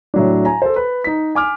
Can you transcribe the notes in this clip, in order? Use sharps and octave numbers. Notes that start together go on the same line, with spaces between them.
A2 F#3 D4
G#5 A#5
A4 C5
B4
D#4 B6
G#5 D6 F6